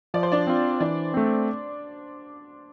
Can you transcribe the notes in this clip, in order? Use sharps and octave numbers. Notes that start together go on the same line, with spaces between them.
F3 D5
C5
D4 D5
C4 F4
E3 D4 D5
A3 C4